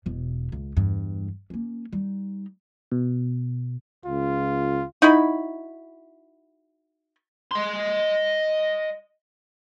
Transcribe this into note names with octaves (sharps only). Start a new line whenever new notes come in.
E1 B2
C#2
E2 G2
A#3 C#4
G3 D#4
B2
C#2 F4
D#4 E4 F#4 B5
D#5 C6